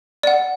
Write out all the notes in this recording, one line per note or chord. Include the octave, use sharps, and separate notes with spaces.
D5 F#5